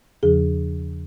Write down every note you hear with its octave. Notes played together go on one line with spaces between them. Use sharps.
E2 C#3 F3 G#4